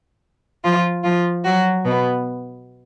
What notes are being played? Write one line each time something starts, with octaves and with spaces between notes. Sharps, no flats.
F3 F4
F3 F4
F#3 F#4
B2 B3